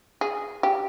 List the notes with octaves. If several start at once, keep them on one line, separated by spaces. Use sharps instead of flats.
G#4
G4